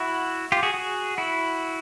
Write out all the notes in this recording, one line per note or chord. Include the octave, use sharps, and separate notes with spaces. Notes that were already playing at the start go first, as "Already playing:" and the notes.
Already playing: E4 F#4
F4 G4
F#4 G#4
F#4 G#4
E4 F#4